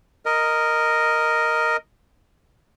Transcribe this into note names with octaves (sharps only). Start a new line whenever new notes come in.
A#4 D#5